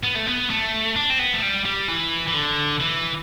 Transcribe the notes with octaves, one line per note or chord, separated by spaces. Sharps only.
B3
A3
B3
A3
D4
C4
B3
A3
G3
G3
E3
E3
D3
E3